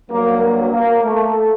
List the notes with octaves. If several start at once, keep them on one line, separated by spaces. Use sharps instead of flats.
G2 F#3 A#3
A#3
A#3
A3